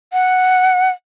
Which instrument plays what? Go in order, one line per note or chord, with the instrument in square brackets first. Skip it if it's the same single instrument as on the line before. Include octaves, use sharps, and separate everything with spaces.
[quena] F#5